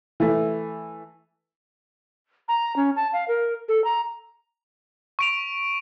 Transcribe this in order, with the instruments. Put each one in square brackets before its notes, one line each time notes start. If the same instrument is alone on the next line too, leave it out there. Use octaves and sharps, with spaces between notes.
[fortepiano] E3 A3
[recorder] A#5
C#4
A5
F5
A#4
A4
A#5
[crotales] C#6 D7 F7